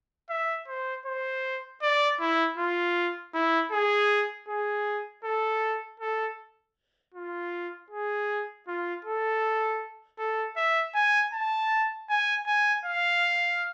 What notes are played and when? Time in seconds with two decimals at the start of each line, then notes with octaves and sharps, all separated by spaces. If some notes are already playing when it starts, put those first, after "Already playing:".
0.30 E5
0.68 C5
1.06 C5
1.82 D5
2.20 E4
2.58 F4
3.34 E4
3.72 G#4
4.49 G#4
5.24 A4
6.00 A4
7.14 F4
7.90 G#4
8.68 F4
9.05 A4
10.19 A4
10.57 E5
10.95 G#5
11.34 A5
12.09 G#5
12.47 G#5
12.85 F5